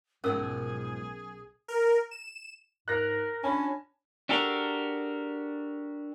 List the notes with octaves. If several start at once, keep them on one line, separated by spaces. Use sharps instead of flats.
B1 G#2 B2 F3 C#4 G#4 A#4 E6
A#4
E7
G#2 A#4 F#6 A#6
C#4 D4 G#5 A5 B5
D4 F#4 G4 A4 A#4